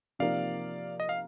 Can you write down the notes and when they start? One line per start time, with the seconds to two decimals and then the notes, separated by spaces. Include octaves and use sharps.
0.19 C3 F3 A#3 D#4 A#4 D5 F5
1.00 D#5
1.09 F5